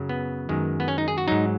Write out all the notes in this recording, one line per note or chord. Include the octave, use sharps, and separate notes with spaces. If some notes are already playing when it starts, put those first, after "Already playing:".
Already playing: F#2 C#3 F#3
B3
F#2 D#3 G#3
B3
C#4
D#4
G#4
F#4
G#2 F#3 D#4